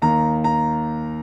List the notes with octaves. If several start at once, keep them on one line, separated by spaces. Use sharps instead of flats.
D#2 D#3 A#5
A#5